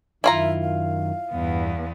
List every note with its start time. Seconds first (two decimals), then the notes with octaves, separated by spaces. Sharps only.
0.24 F#2 D#3 E4 F4 E5 A#5
0.62 F5
1.31 E2 G2 B3